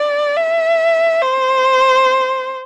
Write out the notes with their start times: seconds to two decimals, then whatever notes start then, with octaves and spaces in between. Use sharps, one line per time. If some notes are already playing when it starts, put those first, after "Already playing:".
Already playing: D5
0.37 E5
1.22 C5